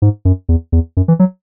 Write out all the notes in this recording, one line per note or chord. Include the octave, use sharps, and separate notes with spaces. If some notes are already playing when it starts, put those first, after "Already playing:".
G#2
F#2
E2
E2
F#2
E3
F#3